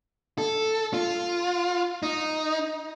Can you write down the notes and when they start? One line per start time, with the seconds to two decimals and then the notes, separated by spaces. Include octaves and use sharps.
0.38 A4
0.94 F4
2.03 D#4